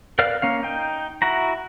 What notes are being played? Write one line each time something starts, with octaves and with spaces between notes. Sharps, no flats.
A#4 B4 D5 F5 F6
A#3 C#4 F5
D#4 G5
E4 F#4 A#5